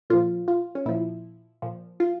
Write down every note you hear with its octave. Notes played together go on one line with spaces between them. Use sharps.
A#2 F3 F4
F4
C#4
A#2 F3 E4
A#2 F3
F4